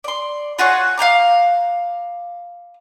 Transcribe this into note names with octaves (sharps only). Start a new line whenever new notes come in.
D5 C6
F4 F#4 G#4 C#5
F5 G5 A#5 D6